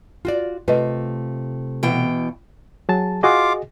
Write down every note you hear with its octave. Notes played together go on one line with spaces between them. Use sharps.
F4 F#4 D5
C3 A3 F4 B4 D#5
B2 E3 G5
F#3 G#4 A5
F4 F#4 G#4 D#5 F5 D6